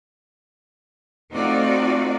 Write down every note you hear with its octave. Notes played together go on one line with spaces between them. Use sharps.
A3 C4 D#4 F4 F#4 D5